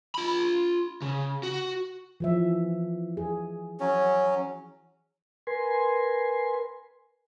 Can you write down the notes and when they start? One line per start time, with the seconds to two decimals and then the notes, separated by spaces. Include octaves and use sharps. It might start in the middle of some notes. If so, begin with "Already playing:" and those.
0.15 F4 B5
1.02 C#3
1.43 F#4
2.20 E3 F3 E5
3.17 G#4
3.80 F#3 C#4
5.47 A#4 B4 G#5 C6